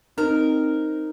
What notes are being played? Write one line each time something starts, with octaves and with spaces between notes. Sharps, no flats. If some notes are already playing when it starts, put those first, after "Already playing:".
C4 D#4 A#4